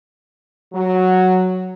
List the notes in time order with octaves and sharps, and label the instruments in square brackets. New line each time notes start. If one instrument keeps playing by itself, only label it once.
[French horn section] F#3